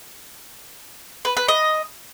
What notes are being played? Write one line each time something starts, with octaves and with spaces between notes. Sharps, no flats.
B4
B4
D#5